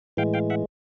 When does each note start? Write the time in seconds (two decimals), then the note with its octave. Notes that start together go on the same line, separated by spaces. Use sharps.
0.17 A2 E3 G#3 F5 G5
0.34 F5 G5
0.50 E5 F#5